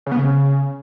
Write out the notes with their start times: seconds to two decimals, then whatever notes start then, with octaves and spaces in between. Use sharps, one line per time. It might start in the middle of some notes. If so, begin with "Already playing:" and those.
0.06 C#3
0.12 B3
0.17 C#3